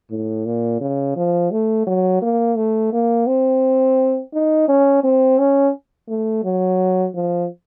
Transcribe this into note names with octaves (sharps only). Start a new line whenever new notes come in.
A2
A#2
C#3
F3
A3
F#3
A#3
A3
A#3
C4
D#4
C#4
C4
C#4
A3
F#3
F3